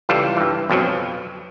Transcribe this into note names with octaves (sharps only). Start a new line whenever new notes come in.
C#2 E3 G3 F4 A4
G2 E3
F2 B2 F3 F#3